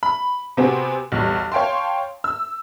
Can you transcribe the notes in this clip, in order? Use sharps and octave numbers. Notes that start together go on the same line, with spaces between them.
B5
C3 B3 C4 F#4 G#4
B1 E2 G3
C#5 F5 G5 A5 C6
E6